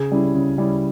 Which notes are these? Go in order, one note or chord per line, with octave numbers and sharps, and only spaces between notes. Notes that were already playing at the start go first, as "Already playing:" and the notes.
Already playing: C#3 G#4
G3 C#4 E4
C#3
G3 C#4 E4